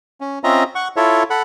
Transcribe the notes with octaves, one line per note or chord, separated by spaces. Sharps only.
C#4
C4 C#4 F4 D#5 E5 A#5
F#5 C#6
E4 F4 A4 C#5 E5
A4 F#5 B5